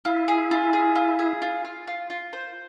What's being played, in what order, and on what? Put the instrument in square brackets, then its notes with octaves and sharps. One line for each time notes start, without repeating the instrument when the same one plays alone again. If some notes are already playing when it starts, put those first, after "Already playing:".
[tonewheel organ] E4 [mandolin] F4
[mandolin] G#4
F4
G#4
F4
G#4
F4
F4
F4
F4
C5